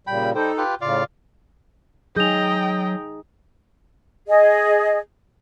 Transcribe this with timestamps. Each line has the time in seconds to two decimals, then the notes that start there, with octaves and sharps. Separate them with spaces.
0.07 A#2 C#3 G3 G5 B5
0.35 G3 D#4 A4 C5 G5
0.57 F4 G4 B4
0.81 A2 C#3 F4 D5 F5
2.16 F#3 D#4 G#4 D#5 G5 G6 F7
4.27 G#4 D#5